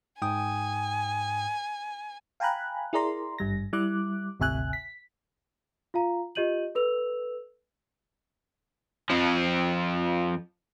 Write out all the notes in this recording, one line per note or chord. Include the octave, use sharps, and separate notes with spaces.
G#2 G5 G#5 D#6
F5 G5 G#5 A#5 B5 F#6
E4 G#4 A#4 D5 A#5 C6
G#1 G2 G3 A#6
G3 E4 D6 F#6
G#1 D2 C3 E5 G#5 F#6
B6
F4 F5 A#5
F4 G4 D#5 G6 D#7 F#7
A4 B4 E6 F7
F2 F3